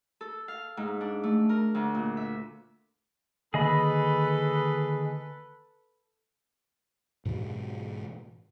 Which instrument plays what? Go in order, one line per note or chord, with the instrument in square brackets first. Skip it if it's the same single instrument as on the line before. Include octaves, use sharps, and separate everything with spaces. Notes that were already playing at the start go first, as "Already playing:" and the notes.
[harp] A4
F5
G#2
D4
A3
A#4
D2
A#2
E5
[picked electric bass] D3 D#3 A#3 [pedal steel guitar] G#4 D#5 B5 [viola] A4 B4
[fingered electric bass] G#2 B2 E3 G#3